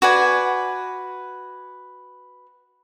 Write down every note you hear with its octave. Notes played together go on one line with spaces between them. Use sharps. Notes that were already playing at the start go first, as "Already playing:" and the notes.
F#4 B4 D5 G#5